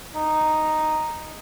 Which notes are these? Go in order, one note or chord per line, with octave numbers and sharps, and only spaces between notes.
D#4